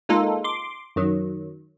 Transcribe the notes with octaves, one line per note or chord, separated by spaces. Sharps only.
G#3 A#3 D#4 F4 A4
C6 D6
F#2 D#3 F#3